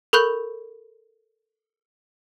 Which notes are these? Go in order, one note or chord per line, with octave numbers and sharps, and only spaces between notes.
A4 A#4 B5 C#6 F#6 G6